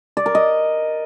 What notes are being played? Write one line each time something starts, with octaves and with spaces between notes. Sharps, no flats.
D5
A#4
D#5